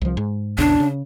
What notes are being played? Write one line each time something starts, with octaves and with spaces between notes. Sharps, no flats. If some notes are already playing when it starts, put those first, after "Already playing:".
C2 F3
G#2
A#1 E2 C#3 D4
C#3